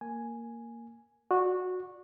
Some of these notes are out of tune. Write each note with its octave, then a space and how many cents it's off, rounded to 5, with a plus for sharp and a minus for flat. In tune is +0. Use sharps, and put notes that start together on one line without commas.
A#3 -10 G#5 +0
F#4 -15 D5 +0